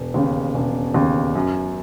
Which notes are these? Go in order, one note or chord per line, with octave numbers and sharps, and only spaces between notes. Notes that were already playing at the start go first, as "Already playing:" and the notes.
Already playing: E1
D#2 C#3
E1
D#2 C#3
F#2